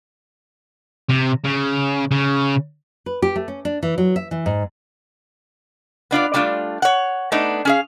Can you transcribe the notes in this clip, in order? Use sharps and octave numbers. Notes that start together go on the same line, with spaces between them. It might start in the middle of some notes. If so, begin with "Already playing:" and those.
C3
C#3
C#3
B4
G4
A3
C#4
D4
E3
F#3
E5
E3
G#2
B3 D4 F4 D5
G3 A3 D4 F4
C#5 F#5
A3 B3 D4 D#4
C#4 G#4 F5